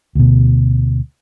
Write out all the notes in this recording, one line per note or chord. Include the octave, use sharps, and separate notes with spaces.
D2 B2